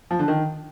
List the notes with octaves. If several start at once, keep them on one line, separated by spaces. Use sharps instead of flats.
F3
D3
D#3